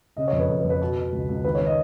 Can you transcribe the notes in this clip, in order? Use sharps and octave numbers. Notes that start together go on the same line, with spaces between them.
C#3 D#5
C#5
F2
B4
F2 A#4
B4
F2
B4
B2
B2
C#2
C#2
D#3 B4
C#5
D#3
D#5